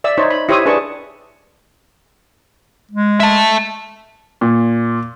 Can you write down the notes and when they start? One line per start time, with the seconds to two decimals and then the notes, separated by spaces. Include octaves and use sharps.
0.04 D5 E5 E6
0.17 D#4 C5 C#5
0.30 B5
0.49 E4 G4 C5 C#5 E5 D#6
0.66 D4 G#4 B4 A5 C#6
2.91 G#3
3.20 E5 A5
4.41 A#2